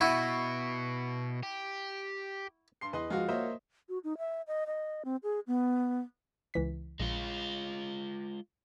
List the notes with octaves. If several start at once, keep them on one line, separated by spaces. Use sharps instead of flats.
B2 E4 F#4
G4
G2 C6 C7
E2 B4 D#5 C6
F3 G#3 F4 F#4
A#3 C5 C#5 D#5 E5
F#4
D#4
E5
D#5
D#5
C4
G#4
B3
C#2 E3 B6
A#1 G#3 F4